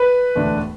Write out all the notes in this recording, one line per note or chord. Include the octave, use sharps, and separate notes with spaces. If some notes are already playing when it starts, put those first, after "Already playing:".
Already playing: B4
E1 D2 D3 A3 D4